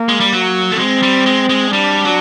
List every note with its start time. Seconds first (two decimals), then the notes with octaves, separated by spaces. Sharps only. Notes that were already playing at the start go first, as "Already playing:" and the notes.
Already playing: A#3
0.09 G#3
0.20 G3
0.32 F#3
0.72 A3
0.79 G#3 C4
1.02 G3
1.26 G#3
1.49 G#3
1.73 G3 D4
2.05 F#3